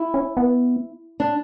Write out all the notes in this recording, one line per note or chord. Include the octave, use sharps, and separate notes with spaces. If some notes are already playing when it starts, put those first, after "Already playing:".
Already playing: E4
C#4
B3
D4